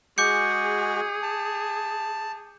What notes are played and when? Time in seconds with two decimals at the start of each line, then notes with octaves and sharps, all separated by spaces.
0.18 G#3 F#4 G#4 D6 G6 C#7
1.23 A5